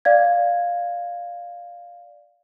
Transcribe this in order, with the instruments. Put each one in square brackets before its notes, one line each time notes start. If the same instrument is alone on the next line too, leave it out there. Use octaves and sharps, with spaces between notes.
[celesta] D5 F5 G#6